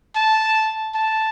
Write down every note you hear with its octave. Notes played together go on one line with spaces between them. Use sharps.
A5
A5